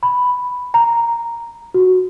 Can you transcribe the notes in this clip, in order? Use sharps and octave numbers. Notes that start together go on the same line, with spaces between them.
B5
A#5
F#4